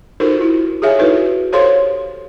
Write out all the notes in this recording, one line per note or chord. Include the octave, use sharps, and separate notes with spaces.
D#4 F4 F#4 A4 A#4 C5
E4
G4 G#4 C#5 E5 F5 G#5
D#4 E4 F#4 A4 B4
G4 A4 C5 C#5 F5 C6